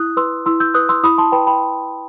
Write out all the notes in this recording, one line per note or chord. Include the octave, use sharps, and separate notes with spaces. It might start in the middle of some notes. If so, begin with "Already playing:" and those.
Already playing: E4 D#6 F#6
B4 C6 E6
E4 C6 E6
E6 G6
B4 D#6 F#6
C6 E6
E4 B5 D#6
A5 C6
B4 G5 B5
G5 B5